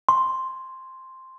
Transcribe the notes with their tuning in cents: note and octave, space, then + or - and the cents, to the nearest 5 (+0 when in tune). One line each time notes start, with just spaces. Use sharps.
C6 +0